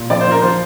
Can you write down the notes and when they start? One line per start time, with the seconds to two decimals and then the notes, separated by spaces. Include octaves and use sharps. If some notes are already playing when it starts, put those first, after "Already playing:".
Already playing: A#2
0.10 F3 D5
0.21 C5
0.27 F3 A#4
0.42 F3 C5